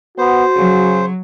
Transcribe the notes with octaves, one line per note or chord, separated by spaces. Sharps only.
B3 F#4 C5
C#3 F#3